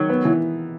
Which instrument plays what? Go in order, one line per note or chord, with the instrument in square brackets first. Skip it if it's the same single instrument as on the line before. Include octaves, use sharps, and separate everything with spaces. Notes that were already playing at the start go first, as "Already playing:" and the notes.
Already playing: [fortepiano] D#3 [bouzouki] F#3
[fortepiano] B3
E3